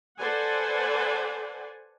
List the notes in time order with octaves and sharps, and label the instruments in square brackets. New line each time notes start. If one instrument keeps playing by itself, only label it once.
[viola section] A4 B4 C5 D5 F#5 G#5